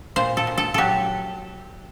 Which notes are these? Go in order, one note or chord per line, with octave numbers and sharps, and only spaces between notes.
A#2 C5
A4
A#2
A4
F#3 G4 A4